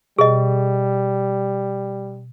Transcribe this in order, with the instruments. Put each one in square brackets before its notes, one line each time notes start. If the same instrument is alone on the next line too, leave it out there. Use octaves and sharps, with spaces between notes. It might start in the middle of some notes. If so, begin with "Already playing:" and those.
[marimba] B2 [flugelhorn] G3 [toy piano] G#4 D#5